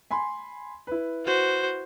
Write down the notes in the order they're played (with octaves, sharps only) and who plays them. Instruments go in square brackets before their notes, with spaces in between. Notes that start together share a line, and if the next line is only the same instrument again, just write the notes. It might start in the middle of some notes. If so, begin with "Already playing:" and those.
[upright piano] G#5 B5 C6
E4 B4
[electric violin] F#4 C5